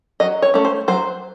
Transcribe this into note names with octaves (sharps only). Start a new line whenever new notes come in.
F#3 D#5
C#5
A3 C#4
C5
F#3 C5